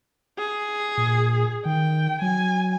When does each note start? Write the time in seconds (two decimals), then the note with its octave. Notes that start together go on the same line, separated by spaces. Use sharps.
0.38 G#4
0.97 A#2
1.65 D#3 G5
2.22 F#3 G#5